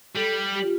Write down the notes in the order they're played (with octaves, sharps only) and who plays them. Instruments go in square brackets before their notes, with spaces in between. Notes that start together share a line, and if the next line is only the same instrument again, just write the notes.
[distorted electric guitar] G3 [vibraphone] A4
[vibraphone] G4
F4